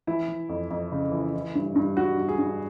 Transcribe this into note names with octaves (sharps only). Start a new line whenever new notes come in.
E3 E4
E3
F2
F2
C#3
E3
E3
G2
G2
G2 F#4
G2
G#4
G2